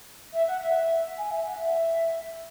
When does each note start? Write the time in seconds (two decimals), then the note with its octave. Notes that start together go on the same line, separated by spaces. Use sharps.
0.33 E5
0.47 F#5
0.61 E5
1.17 G#5
1.31 E5
1.46 F#5
1.59 E5